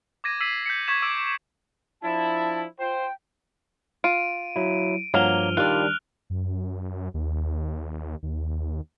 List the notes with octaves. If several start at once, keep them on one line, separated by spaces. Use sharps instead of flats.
D6 G#6 A#6 D#7
E6 B6 C7 D#7
G6 B6 C#7
C#6 D6 G#6 B6 E7
D6 E6 D7
F3 D4 E4 A5
F4 C5 G5
F4 D7 D#7
F#3 E4
G2 F3 F#3 A#3 F6 F7 G7
D#3 G3 D4 F4 D5 F#6
F#2
D#2
D#2